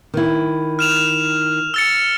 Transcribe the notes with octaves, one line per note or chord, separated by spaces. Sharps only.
D#3 E4
F6 E7 F7
E6 A6 C#7